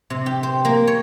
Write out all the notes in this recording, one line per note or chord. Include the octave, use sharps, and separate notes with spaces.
C3
G4
C5
A#3
C#5